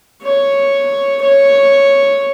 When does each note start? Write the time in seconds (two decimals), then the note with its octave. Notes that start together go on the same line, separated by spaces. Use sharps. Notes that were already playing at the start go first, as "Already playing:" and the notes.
0.23 C#5
1.22 C#5